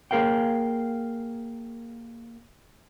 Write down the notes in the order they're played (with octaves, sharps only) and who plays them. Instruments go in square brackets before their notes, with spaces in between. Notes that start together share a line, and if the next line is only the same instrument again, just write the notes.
[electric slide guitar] A#3 G#4 A#4 F5 G5